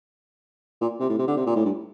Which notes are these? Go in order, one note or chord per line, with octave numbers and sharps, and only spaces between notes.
A#2
C3
A2
C3
D3
C3
A#2
A2
G2